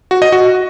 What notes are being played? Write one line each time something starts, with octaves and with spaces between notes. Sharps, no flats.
F#4
D#5
F#4